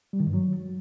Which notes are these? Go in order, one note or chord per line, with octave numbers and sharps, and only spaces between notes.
G3
D#3
G2
F#3